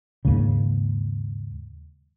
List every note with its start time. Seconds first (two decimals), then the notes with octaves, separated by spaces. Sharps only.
0.25 D#2 G#2 C#3